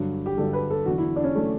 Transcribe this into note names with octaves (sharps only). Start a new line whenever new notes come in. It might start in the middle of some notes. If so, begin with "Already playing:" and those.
Already playing: G2 D3 F#3
G4
G2 D3 F#3 A4
B4
A4
E2 D3 F#3 F#4
E4
D4
C#4
D3 F#3 A3